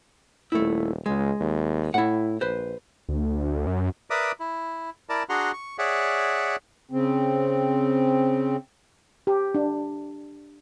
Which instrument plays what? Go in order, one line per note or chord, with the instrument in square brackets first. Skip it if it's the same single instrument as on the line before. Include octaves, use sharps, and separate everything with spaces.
[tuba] D#1 [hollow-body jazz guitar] A3 E4
[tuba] C#2 [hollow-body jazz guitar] G#3
[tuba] D#2
[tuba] A2 [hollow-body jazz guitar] E4 F#5
[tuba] A#1 [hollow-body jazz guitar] B4 C5
[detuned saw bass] D2
F#2
[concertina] A#4 B4 D5 E5 D6 D#6
E4
E4 A#4 D5 A5
D4 F#4 G#4 F#5 A#5 C6
C#6
G#4 C#5 D5 E5 F#5
[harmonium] C#3 C4
[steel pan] G4
D4